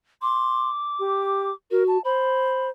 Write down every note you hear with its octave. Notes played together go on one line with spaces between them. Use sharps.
C6 D6
G4
F#4 A#4
A5
C5 B5